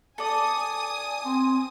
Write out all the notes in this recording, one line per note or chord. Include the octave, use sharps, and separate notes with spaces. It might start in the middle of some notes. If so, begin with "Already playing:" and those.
A4 D5 G#5 D#6
C4